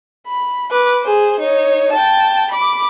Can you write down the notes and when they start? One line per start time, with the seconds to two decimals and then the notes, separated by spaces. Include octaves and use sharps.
0.27 B5
0.71 B4 D6
1.03 G#4 C5
1.40 D#4 C#5
1.93 G5 A5
2.51 B5 D6